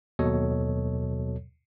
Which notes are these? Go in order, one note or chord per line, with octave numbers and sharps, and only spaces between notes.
D#2 B2 F#3 A4 C#5 D#5